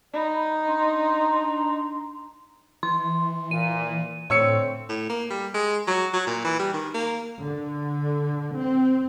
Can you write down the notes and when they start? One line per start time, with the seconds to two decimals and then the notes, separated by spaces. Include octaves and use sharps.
0.14 D#4 D5 B5
0.66 D4 A#5 C6
2.83 E3 C6
3.51 A#2 D#7
4.30 A2 D3 A3 C4 C#5 E6 C#7
4.89 A2
5.10 A#3
5.30 G3
5.54 G#3
5.87 F#3
6.13 F#3
6.27 A#2
6.45 E3
6.59 G3
6.74 D#3
6.94 A#3
7.45 D3
8.59 C4